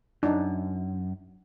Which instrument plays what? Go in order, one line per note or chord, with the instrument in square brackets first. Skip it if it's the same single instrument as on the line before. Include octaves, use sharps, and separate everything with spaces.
[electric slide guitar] F#2 [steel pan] D4 D#4